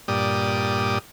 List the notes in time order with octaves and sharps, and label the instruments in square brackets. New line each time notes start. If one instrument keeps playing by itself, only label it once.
[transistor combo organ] G2 A#2 G4 D5 D#6